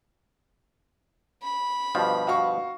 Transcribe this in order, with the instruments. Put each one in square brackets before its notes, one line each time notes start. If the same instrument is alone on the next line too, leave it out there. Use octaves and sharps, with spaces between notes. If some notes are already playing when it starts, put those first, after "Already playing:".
[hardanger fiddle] B5
[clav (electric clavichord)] G2 B2 F3
[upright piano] F#4 F5 C#6